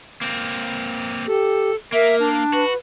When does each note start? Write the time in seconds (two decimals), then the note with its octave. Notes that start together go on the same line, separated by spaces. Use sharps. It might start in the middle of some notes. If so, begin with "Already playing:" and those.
0.21 A#3 C4
1.27 G4 A4
1.92 A#3 A#4 E5
2.19 D4
2.53 F#4 B4